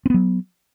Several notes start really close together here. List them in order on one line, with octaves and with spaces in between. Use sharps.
C4 B3 F#3